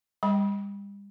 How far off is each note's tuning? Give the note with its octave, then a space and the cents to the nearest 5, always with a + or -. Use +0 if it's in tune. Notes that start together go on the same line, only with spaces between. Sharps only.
G3 +40 G5 +0 B5 -25